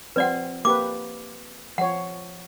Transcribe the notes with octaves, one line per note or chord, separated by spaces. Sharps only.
F3 C4 B4 D5 F#5
A#3 G4 B4 D6
F3 C#5 F#5